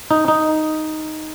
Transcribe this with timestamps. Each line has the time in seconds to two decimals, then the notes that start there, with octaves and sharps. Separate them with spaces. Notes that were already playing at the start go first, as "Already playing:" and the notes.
0.11 D#4
0.28 D#4